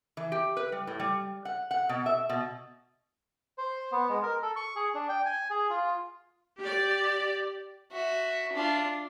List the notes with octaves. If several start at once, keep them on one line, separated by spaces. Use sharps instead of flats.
E3
G4
B4
G3
A2
G3
F#5
F#5
B2
E5
B2
C5
B3
G#3
A#4
A4
C#6
G#4
D4
G5
G#5
G#4
F4
G4 D5
F#4 E5
D4 F4